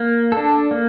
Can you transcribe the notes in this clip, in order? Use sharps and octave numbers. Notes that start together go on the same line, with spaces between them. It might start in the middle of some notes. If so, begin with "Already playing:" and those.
Already playing: A#3
D4 A4
A#3